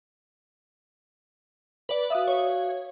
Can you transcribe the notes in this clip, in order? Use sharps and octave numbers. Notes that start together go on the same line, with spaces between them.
B4 D5
F#4 E5 F5 D#6
C#5